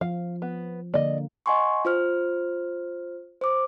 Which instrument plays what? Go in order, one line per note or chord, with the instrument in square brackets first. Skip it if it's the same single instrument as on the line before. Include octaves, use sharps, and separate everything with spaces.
[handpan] F3 [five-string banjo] F5
[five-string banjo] B3
[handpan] D3 A#3 [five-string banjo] D5 D#5
[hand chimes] D#5 F#5 G#5 C6 C#6
F4 C5 F6
C5 D6